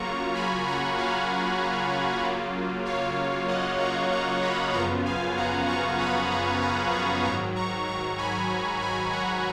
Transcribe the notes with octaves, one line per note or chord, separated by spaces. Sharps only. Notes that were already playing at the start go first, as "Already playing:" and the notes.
Already playing: C#3 F#3 A#3 F4 A#5 C#6
G#5 B5
F#5 A#5
F5 G#5
C#3 F#3 A#3 F4
C#5 F5
D#5 F#5
A#5 C#6
A#5 C#6
B5 D#6
F#2 C#3 F3 B3 F4 A#5 C#6
F5 G#5
F#5 A#5
A#5 C#6
B5 D#6
A#5 C#6
A#5 C#6
A#5 C#6
G#2 D#3 F#3 A#5 C#6
A#5 C#6
A#5 C#6
G#5 B5
G#5 B5
F#5 A#5